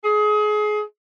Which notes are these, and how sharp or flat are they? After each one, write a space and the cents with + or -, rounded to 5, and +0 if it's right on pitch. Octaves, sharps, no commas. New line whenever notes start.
G#4 +25